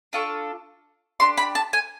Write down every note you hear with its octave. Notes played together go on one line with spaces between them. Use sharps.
D4 F4 A4 C#6
D4 G4 C6
B5
A5
G#5